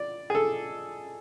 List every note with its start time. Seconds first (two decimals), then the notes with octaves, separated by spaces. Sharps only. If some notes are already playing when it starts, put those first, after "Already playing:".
Already playing: D5
0.30 G#4
0.35 A4